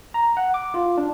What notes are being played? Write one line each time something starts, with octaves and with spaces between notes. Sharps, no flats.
A#5
F#5
D6
F4
D4